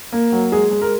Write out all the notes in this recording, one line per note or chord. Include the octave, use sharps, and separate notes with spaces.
A#3
F#3
G#3 G#4
G#3
A#4